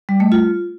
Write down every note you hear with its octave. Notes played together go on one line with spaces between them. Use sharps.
G3
A3
F4